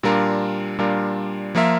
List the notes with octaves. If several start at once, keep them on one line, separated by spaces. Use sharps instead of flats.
A#2 G3 D4 F4 A#4
A#2 G3 D4 F4 A#4
F3 A#3 F4 A#4 E5